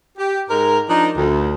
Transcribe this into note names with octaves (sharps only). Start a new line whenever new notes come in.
G4
G#2 G#3 A#4
F3 D4 D#4
D2